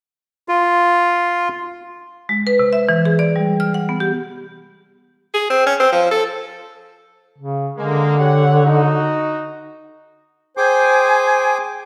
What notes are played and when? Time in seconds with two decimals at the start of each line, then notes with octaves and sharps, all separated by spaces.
0.49 F4
2.29 G#3
2.47 B4
2.59 C3
2.73 E5
2.89 E3
3.05 G#4
3.19 D5
3.36 G3
3.60 F6
3.74 F#5
3.89 B3
4.00 G4
5.34 G#4
5.50 C4
5.66 C#4
5.80 C4
5.92 F3
6.11 A4
7.38 C#3
7.78 D3 G#3 A#3
8.19 G4 C#5 F#5
8.65 D#4 F#4
10.57 G#4 C5 G5 G#5 D6